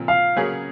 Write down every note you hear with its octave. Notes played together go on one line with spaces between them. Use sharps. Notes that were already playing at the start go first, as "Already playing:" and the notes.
Already playing: A#2 F3 C4
F5
C#3 F#3 A#3 C#4 G#4